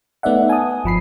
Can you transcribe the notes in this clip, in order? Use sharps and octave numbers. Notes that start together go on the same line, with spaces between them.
A3 B3 D#4 D5 E5 F#5
G#5 A5 D#6
G1 F3 B5 C7